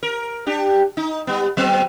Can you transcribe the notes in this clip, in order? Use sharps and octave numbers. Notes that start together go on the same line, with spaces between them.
A#4
D4 G4
D#4
G3 B3
F#3 B3 C4